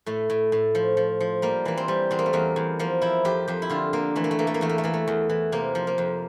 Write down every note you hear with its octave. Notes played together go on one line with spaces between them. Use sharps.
A2 A3
A2
A2
F3
F3
F3
G3 A#3
E3 A#3
C4
G3
E2 C4
A#3
A3
E2 A#3
E2
F3 A#3
F3 E4
F2 G4
F2 G4
E4
D3 F4
D3 A#3
E3 A3
A#3
A3
E3 A#3
A3
A#3
E2 A3
A#3
A3
E3 A#3
A3
E2
E3
C3 A#3
F3
A#3
F2